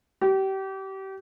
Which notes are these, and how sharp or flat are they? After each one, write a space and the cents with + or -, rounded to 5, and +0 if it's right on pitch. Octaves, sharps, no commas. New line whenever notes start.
G4 -30